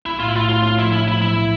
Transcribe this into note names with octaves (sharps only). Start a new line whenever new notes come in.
B1 E4
A2 F4
E4
A2 F4
A2 F4
A2 F4
F3 E4
A2 E4
F3 E4
B1 E4